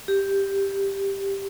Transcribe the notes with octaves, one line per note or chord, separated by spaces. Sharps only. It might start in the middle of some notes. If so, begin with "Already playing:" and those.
G4